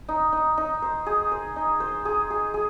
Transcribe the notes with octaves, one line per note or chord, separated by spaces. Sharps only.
D#4
D#4
D#4
C5
G#4
C5
D#4
C5
G#4
G#4
G#4